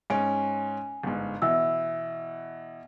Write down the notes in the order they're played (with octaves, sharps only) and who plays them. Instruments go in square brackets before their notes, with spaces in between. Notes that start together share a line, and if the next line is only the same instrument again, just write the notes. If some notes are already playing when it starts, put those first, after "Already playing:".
[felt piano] G#2 C#4 D7 [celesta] G#5
[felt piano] G1 G#2
[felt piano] B2 E3 [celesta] E5 E6